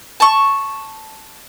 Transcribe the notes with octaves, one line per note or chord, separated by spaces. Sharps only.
A5 C#6